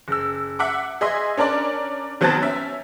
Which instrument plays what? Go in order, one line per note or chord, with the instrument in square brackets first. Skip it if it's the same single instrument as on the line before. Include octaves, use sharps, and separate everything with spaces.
[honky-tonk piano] F#1 E6
E5 F#5 D6
G#4 D#5 E5 C6
C#4 D4 A#4 D5
D#3 F#3 B3 C4 A5 A6
C#4 E5